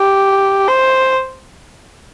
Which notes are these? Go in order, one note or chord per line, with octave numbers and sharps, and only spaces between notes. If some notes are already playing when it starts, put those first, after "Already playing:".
Already playing: G4
C5